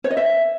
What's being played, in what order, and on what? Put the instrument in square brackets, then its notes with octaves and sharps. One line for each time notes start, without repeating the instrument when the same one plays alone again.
[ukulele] C#5
D#5
E5